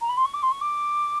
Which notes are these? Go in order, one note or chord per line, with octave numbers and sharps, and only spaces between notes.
A#5
B5
C6
C#6
D6
C6
C#6
D6